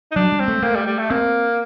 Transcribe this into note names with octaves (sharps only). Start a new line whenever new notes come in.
D#4
F#3 D4
G3
C4
A3
A3 A#3
G3
G3
A3
A#3 C4